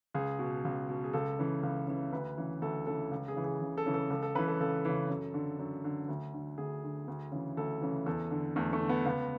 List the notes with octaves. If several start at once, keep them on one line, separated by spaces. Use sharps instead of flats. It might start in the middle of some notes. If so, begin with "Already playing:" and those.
C#2 G#4
B2
C#2
B2
G#4
C#2 A4
C#3 E3
C#2
C#3 E3
D2 B4
C#3 E3
D2 A4
C#3 E3 A4
C#2
G#4
C#3 E3
G#4
C#2
A4
C#3 E3
A4
C#2 A4
A4
C#3 E3 B4
A4
C#2 A4
C#3 E3
F#2
D3
F#2
D3
D2
D3
D2 G#4
D3
D2
C#3 E3
D2 A4
C#3 E3
E2 A4
D3
E2 A3
A3
D3
B3
C#2 B3